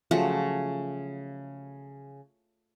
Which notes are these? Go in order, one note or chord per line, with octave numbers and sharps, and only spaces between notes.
C#3 F3 F#3 A3